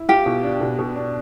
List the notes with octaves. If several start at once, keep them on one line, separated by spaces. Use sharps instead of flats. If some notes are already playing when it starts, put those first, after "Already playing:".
Already playing: E4
F4 G4
B2
D4
B2
B2
D4